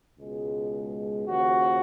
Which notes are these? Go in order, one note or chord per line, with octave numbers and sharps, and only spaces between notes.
C#2 B2 G#3
D#2 C#3 F3 F#4